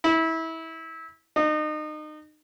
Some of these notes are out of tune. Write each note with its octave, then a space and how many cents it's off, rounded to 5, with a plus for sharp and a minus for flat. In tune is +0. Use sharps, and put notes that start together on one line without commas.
E4 -25
D#4 -30